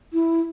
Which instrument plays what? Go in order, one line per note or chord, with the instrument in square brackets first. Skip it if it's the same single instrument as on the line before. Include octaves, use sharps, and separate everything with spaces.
[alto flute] E4